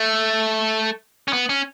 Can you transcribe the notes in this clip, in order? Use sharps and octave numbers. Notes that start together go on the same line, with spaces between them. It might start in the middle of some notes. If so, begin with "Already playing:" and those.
Already playing: A3
C#4
B3
C#4